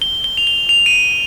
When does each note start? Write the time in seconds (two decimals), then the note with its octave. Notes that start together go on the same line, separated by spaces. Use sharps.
0.02 G7
0.24 G7
0.37 F7
0.47 G7
0.69 F7
0.86 D#7